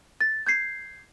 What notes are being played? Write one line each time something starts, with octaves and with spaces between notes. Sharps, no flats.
A6
G6 G#6 C7